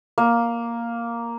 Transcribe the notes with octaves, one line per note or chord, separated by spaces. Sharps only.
A#3